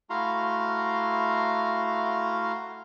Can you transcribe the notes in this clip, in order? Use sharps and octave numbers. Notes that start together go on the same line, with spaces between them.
A3 E4 F#4 F5 A#5 C6